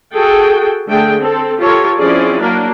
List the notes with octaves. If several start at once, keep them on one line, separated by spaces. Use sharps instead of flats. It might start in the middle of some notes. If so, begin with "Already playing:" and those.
F#4 G#4 A4 G5
D3 A3 G#4 G5
C4 A4
F4 G4 A4 A#4 C#5
F3 C4 C#4 E4 G#4 D5
F#3 A#3 D4 A#4